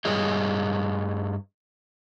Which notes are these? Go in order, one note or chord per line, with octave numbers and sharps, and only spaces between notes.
G2 G3 G#4 C#5 D#5